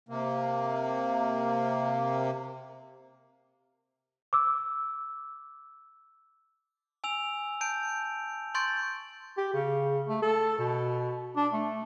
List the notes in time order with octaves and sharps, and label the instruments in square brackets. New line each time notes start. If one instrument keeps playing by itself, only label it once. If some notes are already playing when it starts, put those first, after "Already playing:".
[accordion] C3 A#3
[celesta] D6 E6
[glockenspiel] G#5 E6 F7
A5 G6 D7
C6 C#6 G6 A6 D7
[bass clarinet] G4
C#3
A3
A4
B2
D4
A3